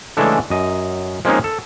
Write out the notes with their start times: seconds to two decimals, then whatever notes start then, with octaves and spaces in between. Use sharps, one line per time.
0.17 C#3 E3 G#3 A3 D4 A4
0.50 F#2 D#5
1.25 F3 G#3 A#3 C4 C#4 D#4
1.44 A4